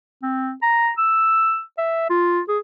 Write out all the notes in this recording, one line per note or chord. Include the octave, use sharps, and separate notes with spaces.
C4
A#5
E6
E5
F4
G#4